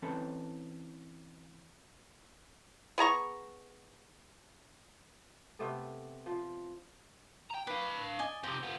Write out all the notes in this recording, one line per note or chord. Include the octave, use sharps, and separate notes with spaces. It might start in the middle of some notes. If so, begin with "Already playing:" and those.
E3 C4 C#4 A4 B4 C5
B3 G#4 A#5 C#6
C3 A3 B3 A4
F3
G5 A#5
D4 B4 F5
D5 D#5 G#5
F2 C3 C5
B3 F4